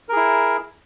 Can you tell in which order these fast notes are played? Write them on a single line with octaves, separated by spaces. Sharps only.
A#4 G#4 E4